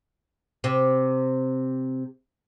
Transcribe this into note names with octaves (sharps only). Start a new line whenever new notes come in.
C3 C4